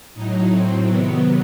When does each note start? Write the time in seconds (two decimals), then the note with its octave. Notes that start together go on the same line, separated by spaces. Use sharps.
0.14 A2 F#3 D#4
0.51 C4
0.88 C3 D#3 F#3 B3